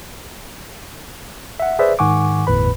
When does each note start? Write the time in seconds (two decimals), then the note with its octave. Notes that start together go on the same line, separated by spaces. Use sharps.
1.60 E5 F#5
1.79 G#4 B4 C5 D5 E5
1.99 G#2 D#3 F#5 G#5 C#6 D6
2.47 G1 E2 A2 B4 B5